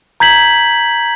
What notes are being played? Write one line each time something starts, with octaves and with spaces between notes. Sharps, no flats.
A#5 G6 G#6 B6 F#7